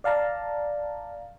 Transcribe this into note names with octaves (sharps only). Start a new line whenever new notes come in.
D5 F5 A5 A#5